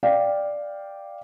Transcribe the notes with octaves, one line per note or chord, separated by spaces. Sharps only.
D5 F5 G5